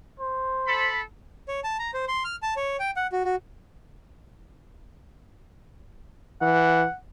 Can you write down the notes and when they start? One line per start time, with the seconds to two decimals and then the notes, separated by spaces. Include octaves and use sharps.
0.20 C5
0.67 A4 B5
1.48 C#5
1.64 A5
1.79 A#5
1.94 C5
2.08 C6
2.25 F6
2.42 A5
2.56 C#5
2.80 G5
2.96 F#5
3.12 F#4
3.25 F#4
6.42 E3 F#5